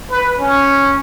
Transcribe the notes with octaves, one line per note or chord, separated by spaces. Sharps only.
B4
C#4